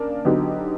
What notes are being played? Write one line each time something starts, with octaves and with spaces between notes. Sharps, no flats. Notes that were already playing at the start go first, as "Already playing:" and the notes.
Already playing: C#3 A#3 D4
D3 F#3 B3 D#4 G4